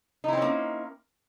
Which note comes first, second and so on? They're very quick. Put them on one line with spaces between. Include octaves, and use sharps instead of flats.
D#4 E4 C4 C#4 A#3